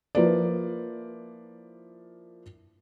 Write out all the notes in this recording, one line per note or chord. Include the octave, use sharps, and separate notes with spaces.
F3 A#3 E4 B4 D5